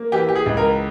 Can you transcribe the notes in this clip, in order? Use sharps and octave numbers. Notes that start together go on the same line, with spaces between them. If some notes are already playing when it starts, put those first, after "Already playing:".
Already playing: A#3
E3 G4
G4
G#4
C#2
A#4